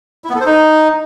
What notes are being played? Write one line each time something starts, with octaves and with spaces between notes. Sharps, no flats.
E4
B3
A4
C5
D#4